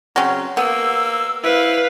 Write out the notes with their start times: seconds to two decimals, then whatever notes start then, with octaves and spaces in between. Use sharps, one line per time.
0.16 C#3 F#3 C4 C#4
0.57 A#3 B3 E6
1.44 E4 B4 C5 F5